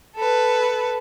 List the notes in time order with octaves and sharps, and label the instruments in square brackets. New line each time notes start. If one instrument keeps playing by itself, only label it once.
[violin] A4 B4